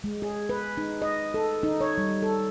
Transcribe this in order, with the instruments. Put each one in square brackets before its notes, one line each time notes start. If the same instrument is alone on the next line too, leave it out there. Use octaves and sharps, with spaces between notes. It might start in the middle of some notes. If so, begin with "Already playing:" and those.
[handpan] G#3
G#4
B4
D#4
D#5
A4
D#4
C#5
G3
A4